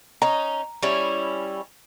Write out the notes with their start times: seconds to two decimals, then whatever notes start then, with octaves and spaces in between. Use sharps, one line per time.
0.22 C#4 D#4 A#5
0.83 G3 C#4 E4